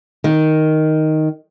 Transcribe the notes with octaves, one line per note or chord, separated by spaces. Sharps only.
D#3